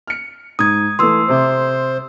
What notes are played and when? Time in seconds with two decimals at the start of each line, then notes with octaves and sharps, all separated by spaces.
0.07 F6 C#7
0.59 G#2 D#6 G#6
0.99 E3 A3 C6 D#6 E6
1.28 C3 C5 D6